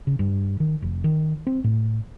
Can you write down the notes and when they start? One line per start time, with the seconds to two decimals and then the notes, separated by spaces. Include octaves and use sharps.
0.07 C#3
0.19 G2
0.60 D#3
0.82 F1
1.04 D#3
1.47 C4
1.64 A2